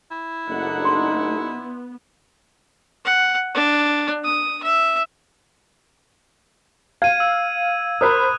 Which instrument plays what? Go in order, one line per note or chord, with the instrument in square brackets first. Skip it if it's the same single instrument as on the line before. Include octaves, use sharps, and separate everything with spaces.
[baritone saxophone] E4
[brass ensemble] F#1 D#4 [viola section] A3 D4 F#5
[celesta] C6
[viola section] B3
[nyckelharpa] F#5
D4
D#6
E5
[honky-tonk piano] F5 [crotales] G#6 D#7
[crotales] E6
[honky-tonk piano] A#4 C5 B5 [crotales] D#6 F#6